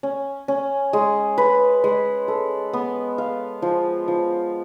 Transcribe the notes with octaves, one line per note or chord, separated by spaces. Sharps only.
C#4
C#4
G#3
B4
G#3
A4
B3
F5
F3
F3